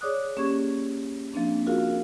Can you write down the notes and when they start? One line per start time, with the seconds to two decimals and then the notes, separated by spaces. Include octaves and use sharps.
0.01 G#4 C#5 D5 D6 D#6 F#6
0.36 A#3 C#4 G4 G#4 C#6 G#6
1.34 F3 A#3 C4 D4
1.67 F4 F#4 G#4 A#4 F5